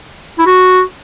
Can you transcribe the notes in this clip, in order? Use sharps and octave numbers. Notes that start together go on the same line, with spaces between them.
E4
F#4